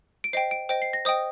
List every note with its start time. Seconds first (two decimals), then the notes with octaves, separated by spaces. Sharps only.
0.24 D7
0.33 C5 D#5 G5 C7
0.51 D7
0.69 C5 D#5 G5 D7
0.82 C7
0.93 A#6
1.05 C5 D#5 G5 D#6